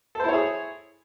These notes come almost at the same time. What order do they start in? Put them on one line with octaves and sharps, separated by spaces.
A4 C5 E4 C#5 G#4